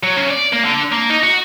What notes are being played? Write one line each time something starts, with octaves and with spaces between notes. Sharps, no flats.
F#3
C#3
D5
A#3
D3
A#3
D#4
F#4